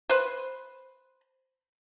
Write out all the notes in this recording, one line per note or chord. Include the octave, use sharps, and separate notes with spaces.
B4 C5